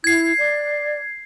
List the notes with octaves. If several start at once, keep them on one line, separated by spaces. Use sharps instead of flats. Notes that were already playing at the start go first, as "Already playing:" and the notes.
E4 G#6 C7
D5